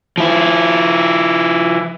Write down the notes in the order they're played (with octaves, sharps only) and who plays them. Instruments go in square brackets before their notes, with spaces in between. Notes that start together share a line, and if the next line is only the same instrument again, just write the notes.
[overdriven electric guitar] F3 E4